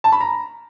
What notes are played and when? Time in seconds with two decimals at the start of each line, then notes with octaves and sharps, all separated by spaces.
0.04 A5
0.12 B5
0.21 A#5